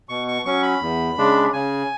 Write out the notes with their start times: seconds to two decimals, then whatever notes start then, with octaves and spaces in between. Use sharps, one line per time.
0.09 B2 C#6
0.28 C#6
0.45 F#3 C#4 C#6
0.63 B5
0.81 E2
1.18 C#3 G#3 D4
1.53 C#3 G#5